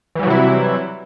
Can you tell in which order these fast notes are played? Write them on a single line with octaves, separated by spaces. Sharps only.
E3 G3 F#3 C3 E4